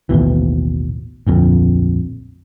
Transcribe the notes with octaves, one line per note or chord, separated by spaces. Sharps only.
A1 D#2 B2 E3
D1 A#1 F2